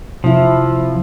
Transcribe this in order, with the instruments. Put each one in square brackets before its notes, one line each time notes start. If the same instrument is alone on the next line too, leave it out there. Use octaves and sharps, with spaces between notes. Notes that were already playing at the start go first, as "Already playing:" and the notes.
[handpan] C3 E4 [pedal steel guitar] F3